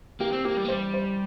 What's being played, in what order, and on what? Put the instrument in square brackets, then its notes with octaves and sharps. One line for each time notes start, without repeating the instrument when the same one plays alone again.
[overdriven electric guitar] A#3 [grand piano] G4
[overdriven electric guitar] C4
[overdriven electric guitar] A#3 [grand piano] G4
[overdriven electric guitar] G3
A#3
[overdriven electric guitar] G3 [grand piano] C5
[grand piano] C5